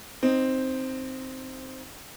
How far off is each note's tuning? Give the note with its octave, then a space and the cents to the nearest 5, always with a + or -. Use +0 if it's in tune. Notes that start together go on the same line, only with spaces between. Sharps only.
C4 +0 D#4 +0